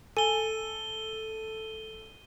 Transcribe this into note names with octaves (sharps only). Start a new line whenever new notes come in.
A4 G#5 D#7 G7